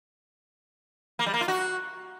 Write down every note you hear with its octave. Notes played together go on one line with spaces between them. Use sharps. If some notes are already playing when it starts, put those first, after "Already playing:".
A#3
G3
A#3
F4
F#4